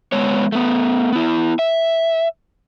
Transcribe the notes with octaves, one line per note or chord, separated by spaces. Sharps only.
G#3 B3 C#5
A3 B3
B3 E4
E5